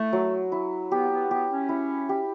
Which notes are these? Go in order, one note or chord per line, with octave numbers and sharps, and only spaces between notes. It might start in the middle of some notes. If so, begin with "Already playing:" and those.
Already playing: A3 E4
F#3
E4
B3 G4
B3
B3 G4
C#4
E4
G4